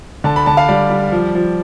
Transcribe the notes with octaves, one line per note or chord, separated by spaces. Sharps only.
D3 A5
B5
D3 A5
F5
G3 D5
G3
F3
F3